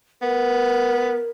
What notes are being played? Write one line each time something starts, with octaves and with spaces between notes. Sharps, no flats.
B3 A#4